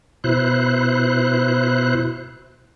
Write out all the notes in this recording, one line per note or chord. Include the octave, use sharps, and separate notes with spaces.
B2 E4 C5 F#6